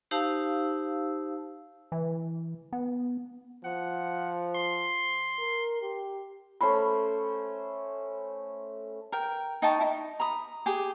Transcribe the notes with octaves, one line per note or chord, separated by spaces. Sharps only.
D#4 G4 C5 F5 A5 E6
E3
B3
F3 F#5
C6
A#4
G4
A3 C#4 C5 B5
A#4 G5
D#4 G5 A5 C#6
D#4 E4
A#5 B5 D#6
G4 G#4 G5